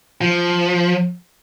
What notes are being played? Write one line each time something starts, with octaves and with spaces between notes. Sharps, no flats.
F3